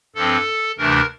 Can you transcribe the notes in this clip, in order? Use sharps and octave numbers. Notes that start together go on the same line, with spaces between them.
G2 F3 C4 A4
D2 C3 E3 A3 D4 A#4